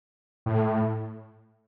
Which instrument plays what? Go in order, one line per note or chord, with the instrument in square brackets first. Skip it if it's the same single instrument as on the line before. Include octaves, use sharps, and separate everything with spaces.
[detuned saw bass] A2